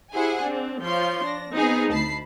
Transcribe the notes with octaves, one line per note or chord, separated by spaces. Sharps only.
E4 G4 G#4 C5 F#5 G#5
C4 D4
F3 F4 C#5 C6 G6
D4 A#6
B3 C4 D#4 G#4 B4
D2 A5 B5 C7